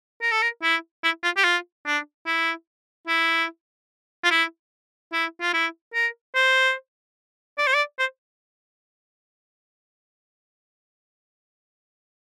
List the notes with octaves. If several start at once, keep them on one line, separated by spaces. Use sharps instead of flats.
A#4
A4
A#4
E4
E4
F4
G4
F4
D4
E4
E4
F4
E4
E4
F4
E4
A#4
C5
D5
C5
D5
C5